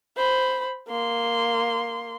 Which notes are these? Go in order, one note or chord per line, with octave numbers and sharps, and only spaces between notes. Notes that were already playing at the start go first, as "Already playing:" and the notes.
C5 B5
A#3 C6